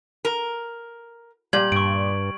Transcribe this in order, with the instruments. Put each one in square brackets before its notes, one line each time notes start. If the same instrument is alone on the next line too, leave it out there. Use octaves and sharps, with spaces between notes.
[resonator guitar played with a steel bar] A#4
[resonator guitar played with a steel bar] A#2 [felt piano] G3 D5 [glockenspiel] G#6 F#7
[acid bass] G2 [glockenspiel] C#6 D7